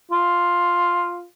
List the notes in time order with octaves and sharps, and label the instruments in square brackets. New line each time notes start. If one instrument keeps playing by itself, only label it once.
[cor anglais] F4